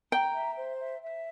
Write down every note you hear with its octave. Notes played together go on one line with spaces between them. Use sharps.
G5 A#5
E5
C5
E5
E5